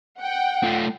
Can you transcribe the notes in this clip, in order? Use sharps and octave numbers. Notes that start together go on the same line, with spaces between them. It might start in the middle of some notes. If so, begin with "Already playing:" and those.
F#5 G5
A3 F4